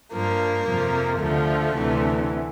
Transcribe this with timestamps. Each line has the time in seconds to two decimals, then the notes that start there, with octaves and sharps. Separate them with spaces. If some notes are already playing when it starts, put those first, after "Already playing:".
0.13 G2 F3 A#3
0.67 F2 C3 F3
1.20 D2 D3 F3 A3
1.74 D2 C3 E3